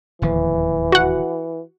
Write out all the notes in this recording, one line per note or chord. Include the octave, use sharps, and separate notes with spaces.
D1 D#2 E3 F3
F#4 F#5